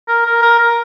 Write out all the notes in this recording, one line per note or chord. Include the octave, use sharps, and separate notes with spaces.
A#4
A#4
A#4
A#4